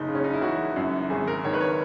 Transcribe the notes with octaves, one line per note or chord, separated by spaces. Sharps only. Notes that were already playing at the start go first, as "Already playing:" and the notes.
Already playing: F#1 D#4
C#3
C#4
D#4
E4
E3 F#4
F#2
G#1 G#4
A#4
D#3 C#5
B4
C#5